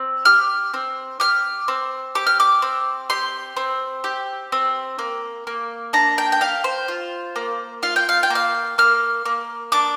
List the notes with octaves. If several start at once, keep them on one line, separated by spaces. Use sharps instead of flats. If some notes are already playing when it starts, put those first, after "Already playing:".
Already playing: C4
G4 F6
C4
G4 F6
C4
G4 D6
F6
D6
C4
G4 C6
C4
G4
C4
A#3
A#3
D4 A#5
G5
G5
G4 F5
C5
F4
A#3
F4 F5
G5
F5
G5
A#3 F5
A#3 F6
A#3
D4 D6